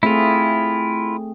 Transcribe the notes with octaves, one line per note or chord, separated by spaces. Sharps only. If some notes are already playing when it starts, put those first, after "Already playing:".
A3 C4 E4 F4 G#4